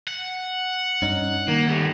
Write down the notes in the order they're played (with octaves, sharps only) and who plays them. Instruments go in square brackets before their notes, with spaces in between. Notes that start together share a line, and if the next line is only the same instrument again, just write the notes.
[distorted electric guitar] F#5
[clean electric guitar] G2 C#4 D#4
[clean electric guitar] D#3 [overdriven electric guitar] A#3
[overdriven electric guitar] G3 A3